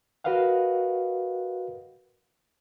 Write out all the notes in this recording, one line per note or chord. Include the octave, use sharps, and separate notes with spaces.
F#4 A#4 B4 D#5 F5 F#5